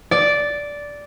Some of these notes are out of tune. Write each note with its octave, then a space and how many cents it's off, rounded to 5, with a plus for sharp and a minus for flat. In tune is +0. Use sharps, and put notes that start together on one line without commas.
D5 -10